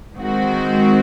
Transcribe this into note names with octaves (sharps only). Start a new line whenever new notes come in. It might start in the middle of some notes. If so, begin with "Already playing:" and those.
D#3 G#3 C4 F#4